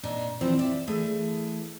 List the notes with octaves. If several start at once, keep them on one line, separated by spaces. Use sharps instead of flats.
A#2 D4 D#4
D2 E3 F3 C4
D5 E5
E3 A3 G#4